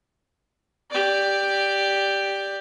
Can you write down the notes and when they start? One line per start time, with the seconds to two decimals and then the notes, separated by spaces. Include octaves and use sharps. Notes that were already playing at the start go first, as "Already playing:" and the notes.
0.91 G4 D5